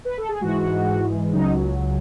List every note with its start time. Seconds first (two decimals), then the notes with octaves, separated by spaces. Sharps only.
0.05 B4
0.17 A4
0.29 G#4
0.41 G#2 E3 G#3 F#4
1.33 C#2 C#3 F#3 D#4